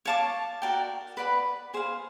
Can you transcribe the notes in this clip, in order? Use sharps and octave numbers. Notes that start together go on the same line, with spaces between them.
C#5 F5 A5 D6
F#4 A#4 D5 G5
B4 D5 F#5 B5
G#4 C5 F5